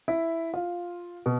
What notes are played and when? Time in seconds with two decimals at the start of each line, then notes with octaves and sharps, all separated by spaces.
0.08 E4
0.54 F4
1.26 B2